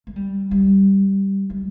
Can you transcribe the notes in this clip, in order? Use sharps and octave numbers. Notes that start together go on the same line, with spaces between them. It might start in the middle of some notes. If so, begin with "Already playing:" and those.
A3
G3
G3
G3